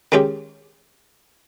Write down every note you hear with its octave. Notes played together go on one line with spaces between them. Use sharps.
D#3 G#3 C#4 G4